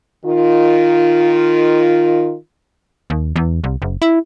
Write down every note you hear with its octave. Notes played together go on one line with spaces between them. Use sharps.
D#3 F4
D#2
E2
C2
F#1
E4